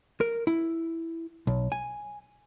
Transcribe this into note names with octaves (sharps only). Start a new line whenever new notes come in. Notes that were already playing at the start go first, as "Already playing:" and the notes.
A#4
E4
B1
G#5